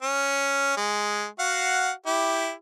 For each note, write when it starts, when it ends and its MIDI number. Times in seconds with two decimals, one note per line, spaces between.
0.02 0.76 61
0.77 1.26 56
1.39 1.91 66
1.39 1.91 77
1.39 1.91 78
2.06 2.52 64
2.06 2.52 67